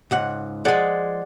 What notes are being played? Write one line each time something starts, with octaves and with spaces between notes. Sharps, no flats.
C#2 G#2 F#5
F3 G#3 G#4 D5 F#5